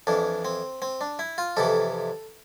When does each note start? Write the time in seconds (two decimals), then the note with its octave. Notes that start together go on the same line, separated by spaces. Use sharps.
0.07 F2 E3 D4
0.45 C4
0.82 C4
1.01 D4
1.19 E4
1.38 F4
1.57 F2 C3 E3 A4